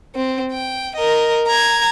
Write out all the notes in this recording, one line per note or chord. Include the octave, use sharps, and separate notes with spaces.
C4
G5
A#4 D#5
A#5 G#6